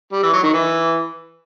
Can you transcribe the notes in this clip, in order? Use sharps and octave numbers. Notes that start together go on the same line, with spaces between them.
G3
E3
F#3
D#3
E3